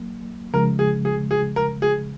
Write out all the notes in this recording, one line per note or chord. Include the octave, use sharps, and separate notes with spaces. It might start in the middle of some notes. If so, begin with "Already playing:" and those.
Already playing: F#3 A#3
C#3 F3 G#3 A#4
G#4
G#4
G#4
A#4
G#4